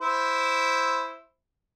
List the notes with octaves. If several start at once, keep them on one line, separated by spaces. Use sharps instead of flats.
E4 C5